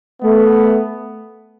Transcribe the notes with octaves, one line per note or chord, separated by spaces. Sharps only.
A3 B3